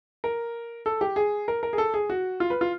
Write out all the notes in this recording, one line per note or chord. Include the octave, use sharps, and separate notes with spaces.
A#4
A4
G4
G#4
A#4
A#4
G#4
A4
G#4
F#4
F4
B4
F4